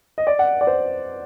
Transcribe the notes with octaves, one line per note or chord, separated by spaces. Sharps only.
D#5
D5
F#5
D5
C5